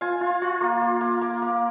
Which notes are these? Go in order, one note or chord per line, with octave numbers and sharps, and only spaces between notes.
F4 F5 G#5
F4
F4
A#3
A#3
A#3
A#3
A#3